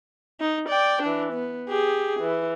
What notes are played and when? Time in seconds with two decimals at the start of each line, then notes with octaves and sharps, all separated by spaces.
0.40 D#4
0.69 D5 G5
1.03 E3 D4
1.33 B3
1.69 G4 G#4
2.20 E3